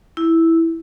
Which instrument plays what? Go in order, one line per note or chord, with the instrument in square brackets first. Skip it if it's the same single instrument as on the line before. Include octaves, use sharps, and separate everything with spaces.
[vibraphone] E4